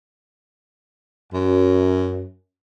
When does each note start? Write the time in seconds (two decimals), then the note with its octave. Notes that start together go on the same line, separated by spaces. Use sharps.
1.33 F#2